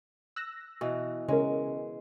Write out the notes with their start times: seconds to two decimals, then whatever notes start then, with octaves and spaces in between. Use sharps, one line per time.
0.36 E6 F#6 A#6
0.81 B2 E3
1.28 C#3 G#3 C#4 A#4